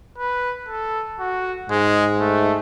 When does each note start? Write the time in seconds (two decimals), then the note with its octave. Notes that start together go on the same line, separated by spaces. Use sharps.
0.18 B4
0.68 A4
1.20 F#4
1.70 G#2 G#3
2.20 A3